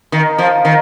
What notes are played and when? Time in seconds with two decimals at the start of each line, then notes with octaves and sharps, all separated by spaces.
0.12 D#3
0.38 F3
0.65 D#3